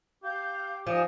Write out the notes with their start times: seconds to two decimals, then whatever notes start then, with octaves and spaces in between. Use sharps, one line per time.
0.23 G4 F5 G6
0.87 F3 D#4 G#5